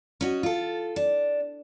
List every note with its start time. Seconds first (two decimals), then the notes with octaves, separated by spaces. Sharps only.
0.21 C#4 F#4 D#5
0.43 F4 A4
0.96 D4